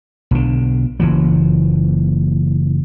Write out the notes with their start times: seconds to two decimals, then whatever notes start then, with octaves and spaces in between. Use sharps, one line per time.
0.31 B1 D3
1.00 F#1 E3 F#3